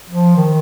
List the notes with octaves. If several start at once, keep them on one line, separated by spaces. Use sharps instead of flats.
F3
D#3